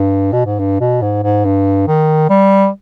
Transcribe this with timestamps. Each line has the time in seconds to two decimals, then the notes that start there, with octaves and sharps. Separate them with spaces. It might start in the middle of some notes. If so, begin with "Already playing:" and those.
Already playing: G2
0.33 B2
0.46 G#2
0.59 G2
0.80 B2
1.02 G#2
1.23 G#2
1.45 G2
1.88 D#3
2.30 G3